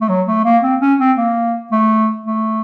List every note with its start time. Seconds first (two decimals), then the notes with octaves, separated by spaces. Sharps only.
0.01 A3
0.09 F#3
0.27 A3
0.45 A#3
0.63 C4
0.81 C#4
1.00 C4
1.18 A#3
1.72 A3
2.26 A3